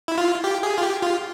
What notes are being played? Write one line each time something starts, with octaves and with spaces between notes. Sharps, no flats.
E4
F4
G4
G#4
F4
G4
F4